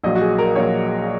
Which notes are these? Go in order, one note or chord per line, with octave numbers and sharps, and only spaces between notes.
A#1 A#2 F#3 D#5
F#4
G#4
A#4
A#1 A#2 F#3 C#5